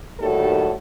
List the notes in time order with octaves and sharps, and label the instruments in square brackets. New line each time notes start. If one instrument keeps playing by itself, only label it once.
[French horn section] D#2 A2 D#3 G3 F#4 A4